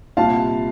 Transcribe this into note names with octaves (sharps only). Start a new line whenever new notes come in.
C2 A#2 F5 A5